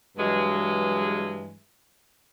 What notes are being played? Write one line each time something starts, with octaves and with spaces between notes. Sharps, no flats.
G2 E3 F#3 G#3